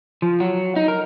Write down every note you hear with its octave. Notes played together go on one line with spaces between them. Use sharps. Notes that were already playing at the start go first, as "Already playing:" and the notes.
F3
F#3
D#4
A#4